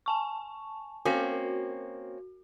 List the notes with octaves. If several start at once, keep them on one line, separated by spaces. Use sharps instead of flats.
G#5 A5 C#6
A#3 C4 C#4 F#4